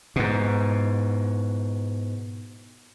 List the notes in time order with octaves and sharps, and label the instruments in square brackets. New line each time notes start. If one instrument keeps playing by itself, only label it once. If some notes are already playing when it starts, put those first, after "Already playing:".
[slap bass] G#2 B2